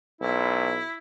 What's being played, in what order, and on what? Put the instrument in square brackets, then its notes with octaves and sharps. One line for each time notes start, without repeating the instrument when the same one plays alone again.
[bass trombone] B1 [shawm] E4